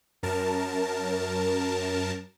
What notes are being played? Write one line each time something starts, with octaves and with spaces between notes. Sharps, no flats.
F#2 A#4 A5